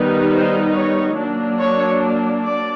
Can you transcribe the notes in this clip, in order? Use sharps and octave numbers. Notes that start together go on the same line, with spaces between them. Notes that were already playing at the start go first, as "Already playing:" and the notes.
Already playing: D#3 G3 B3 D#4
C5
C#5
F#3 A#3 D4
C#5
D5